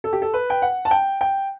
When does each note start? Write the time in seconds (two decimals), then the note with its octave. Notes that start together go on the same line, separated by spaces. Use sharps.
0.04 A4
0.13 G4
0.22 A4
0.34 B4
0.50 G5
0.62 F#5
0.85 A5
0.91 G5
1.21 G5